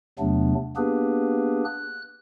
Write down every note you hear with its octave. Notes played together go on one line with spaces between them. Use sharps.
E2 C3 F#3 A3 B3 D4
A#3 B3 D4 G4 G#4 B4
F#6